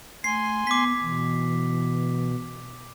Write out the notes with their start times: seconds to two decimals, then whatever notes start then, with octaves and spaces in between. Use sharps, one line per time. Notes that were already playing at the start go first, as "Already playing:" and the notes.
0.24 A3 G#5 C6 C7
0.67 B3 D6 B6
1.03 B2 E3